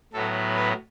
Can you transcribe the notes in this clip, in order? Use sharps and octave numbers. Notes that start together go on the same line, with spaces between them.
A2 F#3 B3 A4
B4